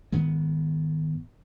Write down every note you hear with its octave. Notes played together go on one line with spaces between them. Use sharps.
G#2 D#3 G#3 B3